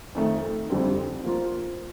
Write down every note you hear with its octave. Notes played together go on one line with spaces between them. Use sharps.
F2 D#3 A3
F2 D3 G3 C4
F3 A#3 F4 C5